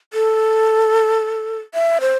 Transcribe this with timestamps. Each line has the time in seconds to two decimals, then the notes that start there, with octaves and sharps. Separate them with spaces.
0.13 A4
1.74 E5
2.01 C5